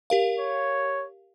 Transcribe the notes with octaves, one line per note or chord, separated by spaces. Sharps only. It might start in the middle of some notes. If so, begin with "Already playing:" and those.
G4 A#4 F5
C#5